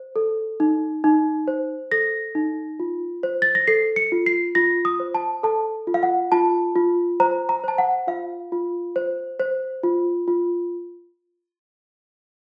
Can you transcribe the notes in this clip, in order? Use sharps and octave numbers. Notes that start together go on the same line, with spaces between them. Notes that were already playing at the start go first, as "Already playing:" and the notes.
Already playing: C5
A4
D#4
D#4
C5
A4 A#6
D#4
F4
C5
A6
A#6
A4 C7
C#7
F4
C7
F4 A#6
D#6
C5
A5
A4 A5
F4
F5
F#5
F4 A5
F4
C5 A#5
A#5
C5 A5
F#5
F4 F5
F4
C5
C5
F4
F4